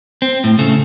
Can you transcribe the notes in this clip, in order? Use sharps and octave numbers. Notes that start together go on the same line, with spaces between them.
C4
A2
C#3 A3